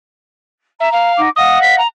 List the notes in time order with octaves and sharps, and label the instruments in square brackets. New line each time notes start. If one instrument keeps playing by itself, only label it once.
[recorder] E5 [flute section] A#5
[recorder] F5
[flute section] D#4 F#5 D6
[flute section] D#5 F5 F#5 [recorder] D#6
[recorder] B6
A#5